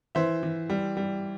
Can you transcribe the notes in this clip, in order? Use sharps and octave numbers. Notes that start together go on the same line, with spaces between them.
E3 C5 E5
E3
G3
G3